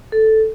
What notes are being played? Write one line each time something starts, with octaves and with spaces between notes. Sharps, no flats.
A4